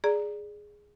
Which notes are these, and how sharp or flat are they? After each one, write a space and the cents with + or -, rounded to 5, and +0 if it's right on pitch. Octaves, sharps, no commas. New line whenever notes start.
G#4 +0 D5 +0 A#5 +0